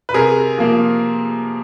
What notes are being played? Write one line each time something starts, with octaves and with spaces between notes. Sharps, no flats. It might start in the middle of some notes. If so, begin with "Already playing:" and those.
B4
C3 G#4 A#4
F3 A#3